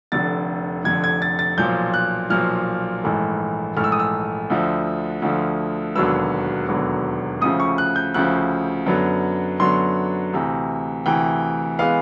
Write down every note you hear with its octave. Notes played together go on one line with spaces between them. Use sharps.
F1 F2 D3 A6
F1 F2 D3 G#6
G#6
A6
A6
B1 A#2 F3 G6
F#6
B1 A#2 F3 F6
A#1 G#2 E3 A3
A#1 G#2 E3 A3 F6
E6
D#6
E6
D2 D3 F3
D2 D3 F3
E1 D#2 D3 F#3 B3 E6
E1 D#2 D3 F#3 B3
D2 C#3 F3 D#6
C#6
F#6
G6
D2 C#3 F3 F#6
F#2 D3 F#3 B3
F#2 D3 F#3 B3 C6
D2 C3 E3
D2 C3 E3 G5
E3 G#3 B3 F5